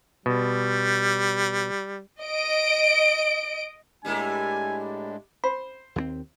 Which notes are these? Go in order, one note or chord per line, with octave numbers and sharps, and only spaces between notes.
B2 G3
D#5 D7
A2 G3 G#3 A#3 D4 E4 G#5
C5 B5
D#2 G3 C4